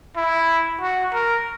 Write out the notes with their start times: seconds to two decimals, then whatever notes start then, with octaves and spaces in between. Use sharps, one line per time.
0.16 E4
0.81 F#4
1.13 A#4